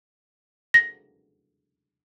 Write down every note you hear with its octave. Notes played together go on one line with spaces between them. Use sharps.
A#6